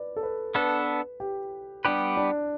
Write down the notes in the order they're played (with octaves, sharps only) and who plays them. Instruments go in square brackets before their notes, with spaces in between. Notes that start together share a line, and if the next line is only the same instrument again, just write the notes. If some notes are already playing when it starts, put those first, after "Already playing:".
Already playing: [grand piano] B4 D5
A4
B4
[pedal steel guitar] B3 D4 A4 [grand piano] B4
[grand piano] G4
[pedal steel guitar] G3 B3 G4 B4 [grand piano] D4
[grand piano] D4